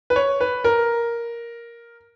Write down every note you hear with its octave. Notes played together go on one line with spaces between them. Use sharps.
B4
C#5
B4
A#4